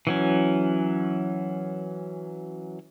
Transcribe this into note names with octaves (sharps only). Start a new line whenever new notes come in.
E3 F#3 C#4